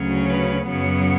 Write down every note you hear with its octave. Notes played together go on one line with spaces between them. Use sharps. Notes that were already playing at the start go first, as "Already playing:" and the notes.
Already playing: D2 C#3 F#3 C#4
B4
F#2 C#3 F#3 B3